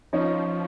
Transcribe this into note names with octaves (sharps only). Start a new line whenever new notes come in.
F3 C#4 D#4